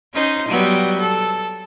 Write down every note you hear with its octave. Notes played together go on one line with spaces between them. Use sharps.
C#4 D#4 C5
F#3 G3 B3
A4